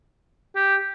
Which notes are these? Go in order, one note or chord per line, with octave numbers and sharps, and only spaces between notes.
G4